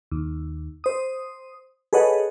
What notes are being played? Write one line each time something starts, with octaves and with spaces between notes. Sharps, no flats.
D#2
C5 D#6
G#4 A4 B4 C#5 D#5 F#5